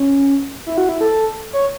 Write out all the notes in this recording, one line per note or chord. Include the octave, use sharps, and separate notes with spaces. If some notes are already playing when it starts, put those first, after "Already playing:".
Already playing: C#4
E4
F#4
E4
A4
C#5